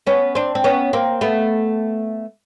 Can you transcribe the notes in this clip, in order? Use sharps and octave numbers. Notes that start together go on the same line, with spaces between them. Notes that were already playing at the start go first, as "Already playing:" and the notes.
B3 C#4
C4 D4
C4
B3 C#4
A#3 C4
A3 B3